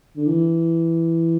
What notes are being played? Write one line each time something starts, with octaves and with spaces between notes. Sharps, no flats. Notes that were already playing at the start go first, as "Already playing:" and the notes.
D3
E3